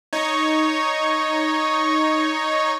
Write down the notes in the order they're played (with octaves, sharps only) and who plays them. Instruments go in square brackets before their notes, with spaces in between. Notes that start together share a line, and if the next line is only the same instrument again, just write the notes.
[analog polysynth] D#4 C#5